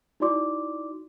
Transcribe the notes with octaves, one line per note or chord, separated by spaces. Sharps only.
D#4 E4 F#4 D5 C6 D6